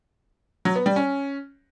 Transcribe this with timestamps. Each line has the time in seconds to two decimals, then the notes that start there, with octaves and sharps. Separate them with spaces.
0.65 F#3
0.76 B3
0.86 G3
0.96 C#4